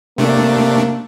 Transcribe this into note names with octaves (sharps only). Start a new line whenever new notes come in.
C3 A3 A#3 D4